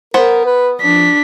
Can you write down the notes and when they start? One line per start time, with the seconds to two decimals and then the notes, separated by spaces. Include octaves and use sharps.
0.14 B3 A#4 C5 F#5
0.45 B4
0.81 F3 D4 B6